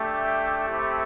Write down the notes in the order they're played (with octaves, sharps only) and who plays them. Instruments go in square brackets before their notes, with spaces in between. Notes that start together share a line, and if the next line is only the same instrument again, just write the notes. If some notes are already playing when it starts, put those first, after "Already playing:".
Already playing: [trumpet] A3 [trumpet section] D4 G4 E5 G5
[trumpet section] C4 E4 G4